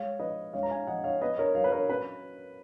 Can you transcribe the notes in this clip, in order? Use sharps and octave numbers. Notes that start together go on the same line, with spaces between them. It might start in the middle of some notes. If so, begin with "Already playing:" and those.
Already playing: G#3 C#5 F5
F3 B4 D#5
G#3 C#5 F5
A#5
F5 G#5
F3 D#5 F#5
C#5 F5
B3 B4 D#5
A#4 C#5
F#3 C#5 F5
B4
A#4 C#5
C#4 B4